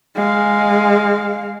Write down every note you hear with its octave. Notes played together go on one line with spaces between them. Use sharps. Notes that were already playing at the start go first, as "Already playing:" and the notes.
G#3 F5